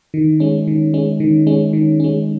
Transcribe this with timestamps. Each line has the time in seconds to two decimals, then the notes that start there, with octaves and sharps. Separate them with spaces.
0.14 D#3
0.40 G#3 C#4
0.67 D#3
0.94 G#3 C#4
1.20 D#3
1.47 G#3 C#4
1.73 D#3
2.00 G#3 C#4